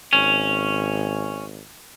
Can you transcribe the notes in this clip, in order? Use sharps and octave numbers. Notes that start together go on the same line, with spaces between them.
G#1 C#4